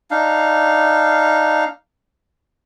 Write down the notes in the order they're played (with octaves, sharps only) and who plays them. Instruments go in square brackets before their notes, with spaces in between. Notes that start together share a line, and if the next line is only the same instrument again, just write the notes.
[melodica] D4 D#4 F5